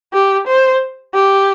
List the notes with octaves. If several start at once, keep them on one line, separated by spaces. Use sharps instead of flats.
G4
C5
G4